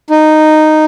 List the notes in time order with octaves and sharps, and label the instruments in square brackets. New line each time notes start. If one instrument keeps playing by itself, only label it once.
[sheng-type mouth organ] D#4